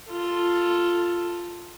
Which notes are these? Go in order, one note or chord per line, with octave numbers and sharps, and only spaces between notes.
F4 A4